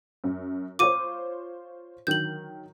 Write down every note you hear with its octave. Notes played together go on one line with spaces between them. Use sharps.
F#2
F4 C5 C#5 D6 D#7
D3 D#3 F#3 G6 F#7